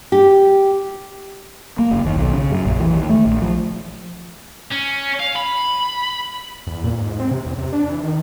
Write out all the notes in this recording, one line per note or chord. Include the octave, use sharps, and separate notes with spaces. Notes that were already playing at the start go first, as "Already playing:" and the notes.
G4
A#3
F#1
D#2
B1
C#3
F#2
A#1
E3
D#2
A3
A#1
F3
C#4
F5
B5
E2
A#2
G#2
C4
C3
E2
C3
D4
E3
D#3